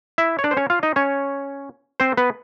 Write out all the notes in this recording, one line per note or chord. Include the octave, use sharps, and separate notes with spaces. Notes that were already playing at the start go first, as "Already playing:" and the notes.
E4 E5
C#5
D4 D5
C5
C#4 C#5
F4 F5
D#4 D#5
C#4 C#5
C4 C5
B3 B4